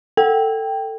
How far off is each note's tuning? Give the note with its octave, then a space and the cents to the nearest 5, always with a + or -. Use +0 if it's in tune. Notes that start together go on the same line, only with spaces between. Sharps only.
A4 +20 G5 +0